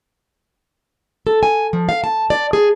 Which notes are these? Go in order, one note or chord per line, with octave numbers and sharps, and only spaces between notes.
A4
G#5
F3
F5
A5
D5
G#4